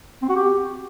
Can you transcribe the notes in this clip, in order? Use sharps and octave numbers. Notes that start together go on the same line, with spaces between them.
C4
F#4
G4